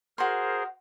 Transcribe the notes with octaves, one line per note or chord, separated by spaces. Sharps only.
F#4 G#4 A#4 C5 C6